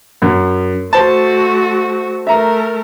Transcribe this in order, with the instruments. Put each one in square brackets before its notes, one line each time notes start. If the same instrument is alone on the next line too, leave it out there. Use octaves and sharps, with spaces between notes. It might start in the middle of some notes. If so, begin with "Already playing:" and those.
[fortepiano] F#2
[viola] A3 F#4 [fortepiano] C5 A5
[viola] A3 A#4 [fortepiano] E5 A#5